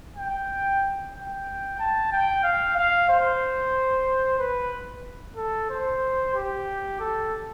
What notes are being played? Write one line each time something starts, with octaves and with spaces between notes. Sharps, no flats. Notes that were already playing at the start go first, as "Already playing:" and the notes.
G5
G5
A5
G5
F5
F5
C5
B4
A4
C5
G4
A4